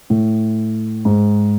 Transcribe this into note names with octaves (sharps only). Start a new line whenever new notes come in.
A2
G#2